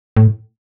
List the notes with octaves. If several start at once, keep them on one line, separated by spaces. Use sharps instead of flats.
A2